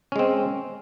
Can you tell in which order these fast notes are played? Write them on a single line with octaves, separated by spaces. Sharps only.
C#4 G#3 C4